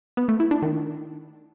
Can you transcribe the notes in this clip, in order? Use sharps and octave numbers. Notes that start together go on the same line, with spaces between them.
B3
A3
E4
D4
D#3